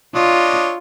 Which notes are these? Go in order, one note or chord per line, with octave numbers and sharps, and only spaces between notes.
D4 F4 C#5 D#5